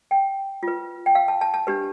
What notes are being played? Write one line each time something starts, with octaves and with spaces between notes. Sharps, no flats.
G5
F4 B4
G5
F5
A5
A5
A5
D4 G4 B4